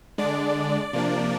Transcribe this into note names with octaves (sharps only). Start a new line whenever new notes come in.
D3 G#3 D4 D5
C3 F3 A#3 D4